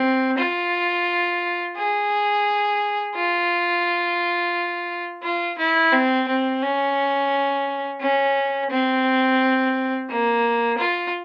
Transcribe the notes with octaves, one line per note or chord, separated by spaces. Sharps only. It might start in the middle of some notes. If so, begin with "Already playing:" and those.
Already playing: C4
F4
G#4
F4
F4
E4
C4
C4
C#4
C#4
C4
A#3
F4